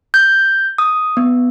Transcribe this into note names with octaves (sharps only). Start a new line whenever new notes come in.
G6
D#6
B3